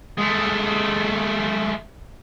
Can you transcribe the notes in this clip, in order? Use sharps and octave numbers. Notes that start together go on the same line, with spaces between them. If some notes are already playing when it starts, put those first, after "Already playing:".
G#3 A3